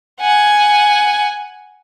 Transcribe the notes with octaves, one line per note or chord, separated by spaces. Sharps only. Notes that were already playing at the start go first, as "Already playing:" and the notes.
F#5 G#5